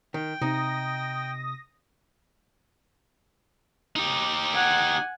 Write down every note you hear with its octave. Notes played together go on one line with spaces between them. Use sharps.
D#3 G5
C3 D#4 D#6 A#6
D#4 G4
F#5 G#5